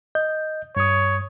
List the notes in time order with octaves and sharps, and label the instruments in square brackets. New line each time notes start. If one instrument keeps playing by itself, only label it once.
[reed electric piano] D#5 G6
[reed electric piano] G2 D#6 [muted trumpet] C#5